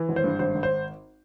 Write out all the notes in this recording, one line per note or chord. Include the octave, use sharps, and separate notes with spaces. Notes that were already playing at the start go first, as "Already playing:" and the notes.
Already playing: E3
G#1
C5
G2
G#1 C5
G#1
C5